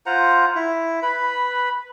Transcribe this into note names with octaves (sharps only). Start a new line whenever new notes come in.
F4 C5 F#5 A#5
E4
B4 B5